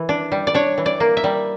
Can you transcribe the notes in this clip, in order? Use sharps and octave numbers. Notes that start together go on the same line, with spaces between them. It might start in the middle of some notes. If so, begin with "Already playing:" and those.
Already playing: E3
D4
G3
D5
D4 C#5
E3
D5
A#3
E5
G3